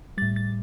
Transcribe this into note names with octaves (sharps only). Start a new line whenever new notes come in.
A2 G3 A6
A6